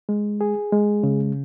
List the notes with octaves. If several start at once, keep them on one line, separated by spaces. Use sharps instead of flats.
G#3
G#4
G#3
C#3